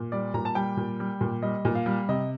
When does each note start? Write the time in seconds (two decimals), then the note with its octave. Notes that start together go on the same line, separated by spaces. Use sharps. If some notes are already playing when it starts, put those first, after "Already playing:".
Already playing: A#2
0.12 G3 D5
0.34 A#2 A#5
0.45 A5
0.55 G3 G5
0.77 A#2
1.00 G3
1.21 A#2
1.42 G3 D#5
1.65 A#2
1.75 F5
1.86 G3
2.09 C3 D#5